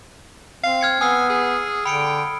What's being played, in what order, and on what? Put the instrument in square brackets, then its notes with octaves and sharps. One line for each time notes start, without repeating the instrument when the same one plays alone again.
[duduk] C4 [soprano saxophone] F5
[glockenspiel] F6 G#6 C#7
[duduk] B3 [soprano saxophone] G#5 [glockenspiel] D#6 E6 C7
[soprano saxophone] G#4
[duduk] D3 [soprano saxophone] G5 [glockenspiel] B5 C#7 D7